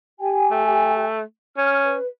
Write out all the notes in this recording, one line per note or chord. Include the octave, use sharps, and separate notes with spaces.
G4 G5 G#5
A3
C#4 F6
B4